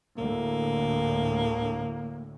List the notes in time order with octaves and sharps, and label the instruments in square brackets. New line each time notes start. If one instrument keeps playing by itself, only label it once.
[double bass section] D2 A2 [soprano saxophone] A#3